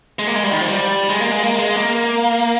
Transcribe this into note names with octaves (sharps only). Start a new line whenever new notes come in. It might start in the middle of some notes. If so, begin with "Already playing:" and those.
G#3
A#3
G#3
G3
D#3
F3
G3
G#3
A#3
G#3
A#3
G#3
A#3